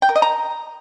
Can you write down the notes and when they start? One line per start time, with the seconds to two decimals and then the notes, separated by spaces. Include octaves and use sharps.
0.02 G5
0.09 A#4
0.16 D#5
0.22 A#5